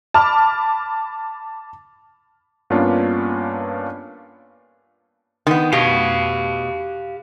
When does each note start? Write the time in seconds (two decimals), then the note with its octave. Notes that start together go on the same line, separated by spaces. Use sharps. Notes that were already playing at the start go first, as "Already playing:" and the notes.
0.14 A5 B5 D6 F6
2.70 G2 A#3 B3 C#4 D4 F4
5.47 D#3 B3
5.72 B2 G4 F5